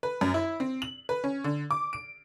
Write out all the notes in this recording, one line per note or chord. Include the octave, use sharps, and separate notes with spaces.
B4
F#2
E4
C4
F#7
B4
C#4
D3
D6
D7